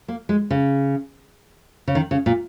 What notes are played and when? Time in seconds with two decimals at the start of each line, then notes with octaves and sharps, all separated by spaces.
0.08 A#3
0.29 G#3
0.51 C#3
1.88 C#3
1.95 D#3
2.11 C#3
2.26 A#2